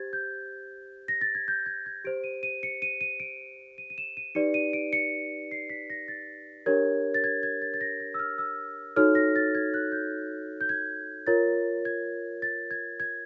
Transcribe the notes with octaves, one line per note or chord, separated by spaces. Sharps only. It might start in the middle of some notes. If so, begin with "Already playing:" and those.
Already playing: G4 C5 G#6 A6
G6
A#6
A6
G#6
G6
G#6
G#6
G4 C5 D7
D#7
D#7
C#7
D#7
D#7
D7
D#7
D#7
E7
D#7
D#4 G4 B4 D5 C#7
D#7
D7
C#7
C7
B6
A#6
A6
D4 G4 A#4 C#5 G#6
A6
G#6
G#6
A6
A6
A#6
A6
E6
F6
E6
D#4 F#4 A4 C#5 F6
A#6
A6
G#6
F#6
G6
G6
G#6
F4 A#4 C#5 A6
G#6
A6
G#6
G#6